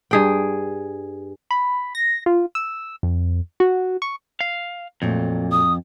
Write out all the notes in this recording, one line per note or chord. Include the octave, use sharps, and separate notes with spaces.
G2 G#4 G5
B5
A#6
F4
E6
F2
F#4
C#6
F5
F2 A#2 F#3 A3
D#6